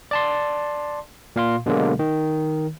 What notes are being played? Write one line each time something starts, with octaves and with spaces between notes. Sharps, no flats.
D5 A5 C6
A#2 F5 C6
B2 D3 F#3 G#3 A#3
D#3